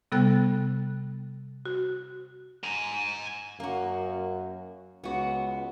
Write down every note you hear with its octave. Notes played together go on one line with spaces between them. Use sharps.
C3 G3 B3 A4 G5 F#6
F#4
G#5 A#5
F#2 A#3 F#4
C#2 B3 F#4